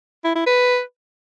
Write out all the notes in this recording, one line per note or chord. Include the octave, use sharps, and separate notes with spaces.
E4
E4
B4